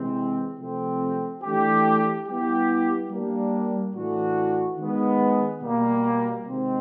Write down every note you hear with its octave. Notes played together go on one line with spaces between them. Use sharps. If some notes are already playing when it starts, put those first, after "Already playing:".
Already playing: C3 E3 G#3 C4
C3 F3 A3 C4
E3 A3 D4 G4
G3 B3 E4 G4
G3 A#3 D4
A2 E3 A3 D4 F#4
D#3 G#3 B3
B2 G3 A#3
C3 D#3 G#3 C4